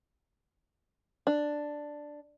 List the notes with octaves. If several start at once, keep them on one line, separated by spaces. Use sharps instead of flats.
D4